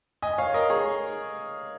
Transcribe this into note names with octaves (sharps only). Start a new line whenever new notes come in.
D#5 G#5
C#5 F5
A#4 D#5
G#4 C#5